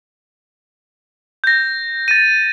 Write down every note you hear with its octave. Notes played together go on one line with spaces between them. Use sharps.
G6 A#6
A6 D#7